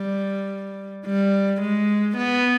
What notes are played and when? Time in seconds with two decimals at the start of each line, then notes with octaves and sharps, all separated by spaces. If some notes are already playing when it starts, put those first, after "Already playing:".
Already playing: G3
1.05 G3
1.61 G#3
2.17 B3